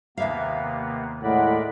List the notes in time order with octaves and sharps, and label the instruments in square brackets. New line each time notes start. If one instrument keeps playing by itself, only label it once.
[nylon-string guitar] D#2 E5 F5 [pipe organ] C3 A#3 B3
[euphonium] A2 [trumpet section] G#3 F#5 [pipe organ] A#4 D5 B5